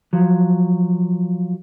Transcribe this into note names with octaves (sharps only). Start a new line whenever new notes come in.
F3 F#3